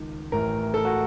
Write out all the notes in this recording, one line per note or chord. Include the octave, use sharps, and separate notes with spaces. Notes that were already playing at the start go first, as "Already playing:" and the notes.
Already playing: C#2 D#3
A1 A2 A#4
A4
F#4